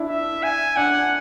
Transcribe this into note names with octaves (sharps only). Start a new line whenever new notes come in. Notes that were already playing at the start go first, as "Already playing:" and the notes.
Already playing: D4 E4
E5
G#5
D4 F#5